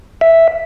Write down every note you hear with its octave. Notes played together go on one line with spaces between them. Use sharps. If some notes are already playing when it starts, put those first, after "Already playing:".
E5